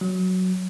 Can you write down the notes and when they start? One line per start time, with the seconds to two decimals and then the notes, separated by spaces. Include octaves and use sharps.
0.01 F#3